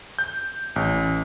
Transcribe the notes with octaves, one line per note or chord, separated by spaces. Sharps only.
G6
A1